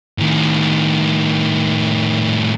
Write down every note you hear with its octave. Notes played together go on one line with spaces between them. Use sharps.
A2 D#3